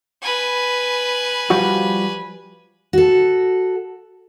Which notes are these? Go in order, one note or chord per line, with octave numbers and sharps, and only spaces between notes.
B4 G#5
F3 G3 F#4
F#4 A4